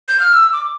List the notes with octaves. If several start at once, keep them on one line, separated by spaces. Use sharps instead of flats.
G6
F6
E6
D6